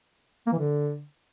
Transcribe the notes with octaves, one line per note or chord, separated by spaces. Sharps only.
A#3
E3
D3